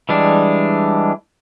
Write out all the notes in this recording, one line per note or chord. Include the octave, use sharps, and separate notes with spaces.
E3 G3 G#3 D4